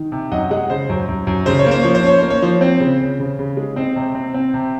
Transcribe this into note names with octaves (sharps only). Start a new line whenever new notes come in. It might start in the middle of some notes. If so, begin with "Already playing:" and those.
Already playing: D#3
C3
F#2 D#5 F#5
G#3 D#5 F#5
C#3 C5
F#2
F#2
F#2
C#3 C5
C#5
A#3 C5
F3 C#5
C5
C#4 C#5
A#3 C5
C#5
F3 C5
C4 C5
C#3
C#3
C#3
C#3
G#3
C4 C5 D#5
C3
C4
C4
C3